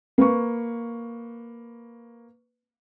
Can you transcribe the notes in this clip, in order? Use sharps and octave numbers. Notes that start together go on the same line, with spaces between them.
A#3 B4 C#6